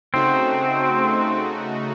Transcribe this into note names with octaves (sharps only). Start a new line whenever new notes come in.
C#3 A3 C4 D#4 F#4